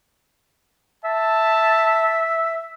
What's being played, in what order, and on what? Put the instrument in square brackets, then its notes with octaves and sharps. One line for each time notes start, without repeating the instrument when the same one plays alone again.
[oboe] E5 [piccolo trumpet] A5